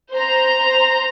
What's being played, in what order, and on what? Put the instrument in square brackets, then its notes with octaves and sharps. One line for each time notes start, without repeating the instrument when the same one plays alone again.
[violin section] C5 A#5